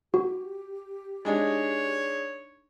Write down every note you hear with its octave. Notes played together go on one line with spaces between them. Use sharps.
F#4 G4
G#3 D4 D#4 C#5